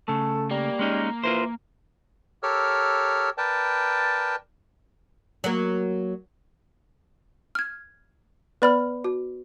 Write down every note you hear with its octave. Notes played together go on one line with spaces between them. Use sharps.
C#3 A3 A4
G3 A#3
G#3 C#4 D#4
E3 F4 A#4 C5
G4 A4 A#4 C#5 E6 F6
A#4 B4 D5 G5 A5
F#3 A#3
F6 G#6
B3 B4 D5 B5 F6
F#4